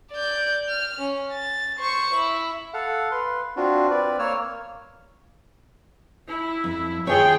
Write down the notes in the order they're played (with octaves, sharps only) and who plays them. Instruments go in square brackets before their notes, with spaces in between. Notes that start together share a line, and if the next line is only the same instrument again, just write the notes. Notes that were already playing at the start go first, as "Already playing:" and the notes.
[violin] D5 G6
F6
C#4
A6
C5 C#6
E4
[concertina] A4 F5 F#5
B4 C6
C4 D4 F4 F#4
C4 B4 D5
A#3 C#5 E6 F6
[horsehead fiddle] E4
[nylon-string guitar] F2
[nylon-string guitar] D#2 F4 C#5 [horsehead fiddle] G#4 [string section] G5